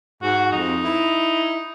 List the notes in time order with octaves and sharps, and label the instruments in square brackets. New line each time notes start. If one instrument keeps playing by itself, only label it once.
[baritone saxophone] G#2 [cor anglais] F#4
[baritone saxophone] F2 [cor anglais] D#4
[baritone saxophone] E4